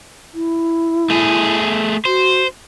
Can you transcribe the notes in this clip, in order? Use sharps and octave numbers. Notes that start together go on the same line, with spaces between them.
E4
A3 G#4
F#4 C5